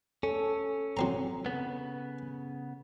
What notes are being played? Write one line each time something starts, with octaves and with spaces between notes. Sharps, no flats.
C#4 A4
F#3 C4 A#5
C#3 B3